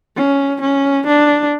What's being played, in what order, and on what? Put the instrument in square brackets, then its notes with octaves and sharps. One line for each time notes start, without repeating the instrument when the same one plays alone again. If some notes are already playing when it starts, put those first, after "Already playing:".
[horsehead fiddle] C#4
C#4
D4